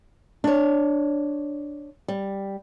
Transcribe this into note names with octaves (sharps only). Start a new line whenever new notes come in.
D4 C#5
G3